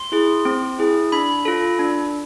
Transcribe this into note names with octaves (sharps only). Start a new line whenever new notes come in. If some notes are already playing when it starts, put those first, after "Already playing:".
Already playing: C6
E4 G#4
C4
E4 G#4
D4 B5
F4 A4
D4